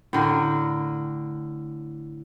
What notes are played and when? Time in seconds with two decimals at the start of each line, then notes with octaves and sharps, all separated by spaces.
0.13 A2 D3 A#4